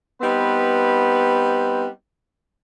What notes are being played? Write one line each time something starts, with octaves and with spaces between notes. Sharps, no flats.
G3 B3 C4 D#4 B4